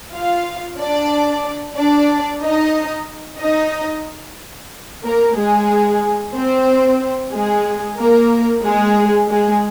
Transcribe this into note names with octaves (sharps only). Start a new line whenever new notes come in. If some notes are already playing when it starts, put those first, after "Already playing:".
F4 F5
D4 D5
D4 D5
D#4 D#5
D#4 D#5
A#3 A#4
G#3 G#4
C4 C5
G#3 G#4
A#3 A#4
G#3 G#4
G#3 G#4